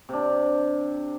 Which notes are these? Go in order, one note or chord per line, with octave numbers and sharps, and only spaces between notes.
C3 D4